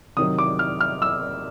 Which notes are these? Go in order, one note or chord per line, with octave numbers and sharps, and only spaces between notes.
C3 D#3 F#3 D#6
D6
F6
F6
E6